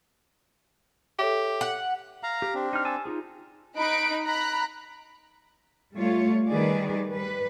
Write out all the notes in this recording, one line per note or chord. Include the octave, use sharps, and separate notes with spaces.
G4 A4 C#5 E5
F#5
F5 A#5
G4
C4 D4
D#4 F6
G#5 A5 E6
D#4 F4 G#4
D#4 B5 F#6 D7
A#5 B5 F#6
G3 A3 F4 C#5
D#3 G3 G#4 B4 D5
G3 B4